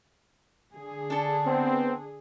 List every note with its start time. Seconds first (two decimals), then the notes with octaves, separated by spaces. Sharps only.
0.75 D3 G#4
1.10 D4 A4
1.46 B3 C4